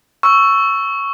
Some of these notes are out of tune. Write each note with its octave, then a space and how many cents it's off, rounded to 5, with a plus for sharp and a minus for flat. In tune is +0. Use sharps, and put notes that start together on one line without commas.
C#6 +5 E6 +5